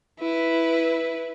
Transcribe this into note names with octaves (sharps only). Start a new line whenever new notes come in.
E4 B4